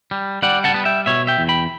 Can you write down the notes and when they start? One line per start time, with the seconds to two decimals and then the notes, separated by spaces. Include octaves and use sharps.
0.11 G3
0.43 G3 D5 F#5
0.64 F#5 A5
0.74 B3
0.85 E5 G5
1.06 B2 C#5 E5
1.27 E5 G5
1.39 E2
1.48 G5 B5